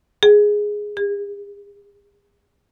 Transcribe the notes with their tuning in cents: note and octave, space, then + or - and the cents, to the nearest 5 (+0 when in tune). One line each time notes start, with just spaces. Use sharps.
G#4 +0
G#4 -45